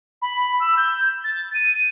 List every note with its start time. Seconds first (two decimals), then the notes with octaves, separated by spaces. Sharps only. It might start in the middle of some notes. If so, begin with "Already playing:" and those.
0.22 B5
0.60 E6
0.77 G6
1.24 A6
1.54 D#7